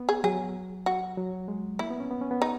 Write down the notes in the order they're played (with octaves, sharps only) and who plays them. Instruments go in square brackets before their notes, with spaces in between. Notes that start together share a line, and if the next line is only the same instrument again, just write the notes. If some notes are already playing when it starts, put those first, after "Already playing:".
Already playing: [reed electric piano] B3
[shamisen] G#4
[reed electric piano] F#3 [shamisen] G#4
[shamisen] F#4
[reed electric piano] F#3
G#3
[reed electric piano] A#3 [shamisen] E4
[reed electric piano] B3
C#4
B3
C#4
B3
[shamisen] D#4